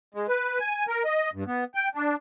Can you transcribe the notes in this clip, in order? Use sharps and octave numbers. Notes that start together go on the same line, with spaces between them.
G#3
B4
G#5
A#4
D#5
G2
B3
G5
D4